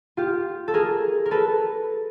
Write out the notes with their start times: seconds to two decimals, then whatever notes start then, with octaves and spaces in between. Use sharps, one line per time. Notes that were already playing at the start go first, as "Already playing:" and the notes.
0.17 F4 G4
0.68 A4
0.74 G#4 A#4
1.26 A#4
1.31 A4 B4